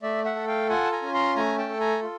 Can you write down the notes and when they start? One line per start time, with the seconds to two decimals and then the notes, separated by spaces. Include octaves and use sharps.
0.02 A3 D5 E5
0.24 E5 F#5
0.36 A4
0.48 F5 G5
0.69 F4 F#5 G#5
0.85 A5
0.92 G#5 A#5
1.02 C#4
1.14 A#5 C6
1.36 A3 G#5 A#5
1.58 G5 A5
1.69 A4
1.80 G#5 A#5
2.02 F4